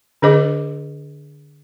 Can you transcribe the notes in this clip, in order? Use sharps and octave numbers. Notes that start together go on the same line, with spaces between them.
D3 D4 G#4 C5 D#5 D6